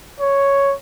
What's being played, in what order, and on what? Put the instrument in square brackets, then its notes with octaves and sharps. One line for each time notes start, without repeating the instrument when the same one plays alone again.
[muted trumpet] C#5